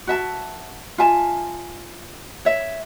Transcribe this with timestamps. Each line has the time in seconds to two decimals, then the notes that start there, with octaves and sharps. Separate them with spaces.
0.07 F#4 E5 A5
0.98 F4 E5 G#5 A5
2.45 C#5 E5